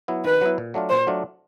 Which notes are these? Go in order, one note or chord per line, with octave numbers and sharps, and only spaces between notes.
F#3 B3 E4
D#3 B4
F#3 B3 E4
A#2
F#3 A3 D4 F4
A#2 C5
F#3 A3 D4 F4